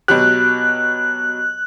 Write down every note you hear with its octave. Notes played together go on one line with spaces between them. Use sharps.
B2 F#3 G4 F#6